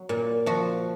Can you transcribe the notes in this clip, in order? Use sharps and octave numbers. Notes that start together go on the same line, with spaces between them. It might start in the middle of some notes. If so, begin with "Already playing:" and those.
Already playing: F#3
A#2
F3 F#4